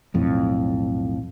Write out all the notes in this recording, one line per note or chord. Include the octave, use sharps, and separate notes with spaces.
B1 F2 A2